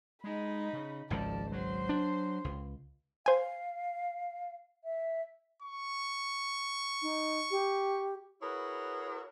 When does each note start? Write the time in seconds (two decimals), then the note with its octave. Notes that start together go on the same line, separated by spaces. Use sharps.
0.24 G#3 D#4 B5
0.73 C#3
1.10 G#1 C#2 D#3 F3 D5 A5
1.52 F#3 C5 C6
1.89 D4
2.44 C#2
3.26 C5 F5 G#5
4.84 E5
5.62 C#6
7.02 D#4
7.51 G4
8.42 E4 F#4 G#4 A#4 B4 C#5